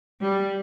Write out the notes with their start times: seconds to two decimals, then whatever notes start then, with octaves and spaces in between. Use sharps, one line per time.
0.21 G3